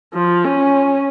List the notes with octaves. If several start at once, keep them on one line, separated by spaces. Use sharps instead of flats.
F3
C#4